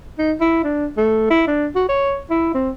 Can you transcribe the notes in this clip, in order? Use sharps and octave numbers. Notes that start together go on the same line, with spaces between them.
D#4
E4
D4
A3
E4
D4
F#4
C#5
E4
C4